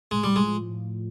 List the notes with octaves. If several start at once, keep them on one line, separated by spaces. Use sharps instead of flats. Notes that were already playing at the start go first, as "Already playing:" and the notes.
A2 G#3
G3
F3 G#3
A2